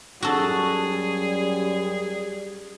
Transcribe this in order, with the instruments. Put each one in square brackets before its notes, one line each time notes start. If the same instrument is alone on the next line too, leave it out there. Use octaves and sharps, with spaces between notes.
[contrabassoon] F#2 [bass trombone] G3 [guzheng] F#4 A4 [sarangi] G#4